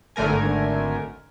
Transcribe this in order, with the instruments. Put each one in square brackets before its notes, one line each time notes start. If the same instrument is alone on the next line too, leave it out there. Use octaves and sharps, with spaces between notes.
[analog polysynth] G#1 D3 A3 A#4 G#5